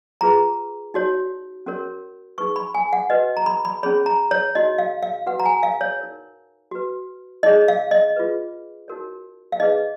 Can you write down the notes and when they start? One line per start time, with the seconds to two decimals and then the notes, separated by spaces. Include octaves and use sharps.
0.21 F4 G#4 B4 A#5
0.94 D#4 F#4 C#5
1.66 C#4 F#4 A#4 C#5
2.38 D#4 G#4 B4 C#6
2.56 B5
2.74 G#5
2.93 F#5
3.10 F#4 B4 D#5
3.37 A#5
3.46 B5
3.65 B5
3.83 C#4 G#4 C#5 B5
4.06 A#5
4.31 C#5
4.55 D#4 F#4 C#5 D#5
4.78 F5
5.03 F5
5.26 F#4 B4 F#5
5.40 A#5
5.46 G#5
5.63 F5
5.81 C#5
5.99 D#4 A#4 C#5
6.71 F#4 B4
7.43 D#4 G#4 C#5 D#5
7.68 F5
7.91 D#5
8.16 F4 G#4 B4
8.88 D#4 F#4 A#4 C#5
9.52 F5
9.60 D#4 G#4 B4 D#5